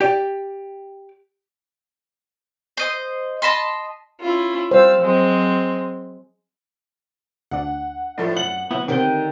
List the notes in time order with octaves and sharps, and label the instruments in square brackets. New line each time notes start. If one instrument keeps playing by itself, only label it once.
[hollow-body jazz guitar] G4 D5
[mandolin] C5 D#5
D#5 A5 B5 C6
[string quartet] C#4 E4 F4
[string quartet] G3 F5 E6 [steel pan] C5
[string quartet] F#3 G#3 C4
[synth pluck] D2 D4 [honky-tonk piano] F#5
[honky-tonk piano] A2 F3 A3 [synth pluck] D5
[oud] F#2 [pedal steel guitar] F#5 [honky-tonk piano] F#7
[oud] D2 F#3 [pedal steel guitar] B3 [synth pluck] E4 F#5
[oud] D3 G4 A#4 [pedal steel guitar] D#3 G5 [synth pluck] B3 C4